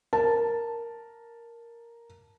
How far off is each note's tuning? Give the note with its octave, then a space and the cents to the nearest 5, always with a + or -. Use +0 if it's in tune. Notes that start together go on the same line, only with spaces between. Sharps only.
A#4 +0 A5 +0